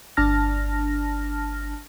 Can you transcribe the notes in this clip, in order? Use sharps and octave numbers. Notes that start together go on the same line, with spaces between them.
G1 D4 A5 F6 A#6